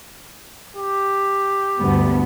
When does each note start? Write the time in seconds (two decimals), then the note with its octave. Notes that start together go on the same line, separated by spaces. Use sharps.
0.76 G4
1.79 D2 G2 B3